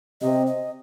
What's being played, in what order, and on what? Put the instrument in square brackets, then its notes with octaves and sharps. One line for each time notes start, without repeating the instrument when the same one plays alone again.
[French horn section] C3 [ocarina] D#5
[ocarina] D#5